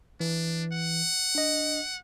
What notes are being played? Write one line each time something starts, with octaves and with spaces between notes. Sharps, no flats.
E3 D4
F#5
D4 D#5